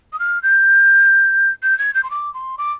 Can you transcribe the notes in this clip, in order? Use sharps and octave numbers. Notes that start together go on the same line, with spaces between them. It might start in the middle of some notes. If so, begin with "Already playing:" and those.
D#6
F6
G6
G6
G#6
G6
C6
D6
C6
D6